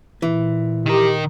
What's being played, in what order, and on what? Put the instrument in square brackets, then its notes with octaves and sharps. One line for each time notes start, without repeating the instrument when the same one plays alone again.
[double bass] A#2 [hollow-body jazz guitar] E3
[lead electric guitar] D#3 A#4 [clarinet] G4